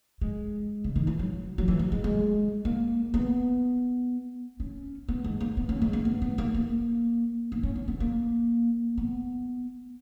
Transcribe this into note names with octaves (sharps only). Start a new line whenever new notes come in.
G#3
C#3
D#3
E3
F#3
F#3
E3
F#3
G#3
G#3
A#3
B3
C#4
B3
G#3
A#3
B3
C#4
G#3
A#3
B3
B3
A#3
A#3
B3
C#4
B3
B3
A#3
B3